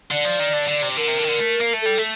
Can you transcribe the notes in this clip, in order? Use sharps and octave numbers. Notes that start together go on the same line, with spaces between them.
D3 D5
F3
D#3
D3
D3
C3
D3 A#4
C3
D3
D#3
D3
A3
A#3
A3
G3 A4
A3